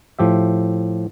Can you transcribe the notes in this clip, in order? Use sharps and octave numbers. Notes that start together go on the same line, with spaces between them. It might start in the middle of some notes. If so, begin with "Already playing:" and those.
A2 F3 G4 E5